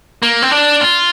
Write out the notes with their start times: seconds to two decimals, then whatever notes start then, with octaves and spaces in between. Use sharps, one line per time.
0.22 A#3
0.42 C4
0.51 D4
0.81 F4